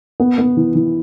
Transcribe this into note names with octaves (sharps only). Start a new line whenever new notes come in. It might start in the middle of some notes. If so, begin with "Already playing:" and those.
B3
B3
E3
E3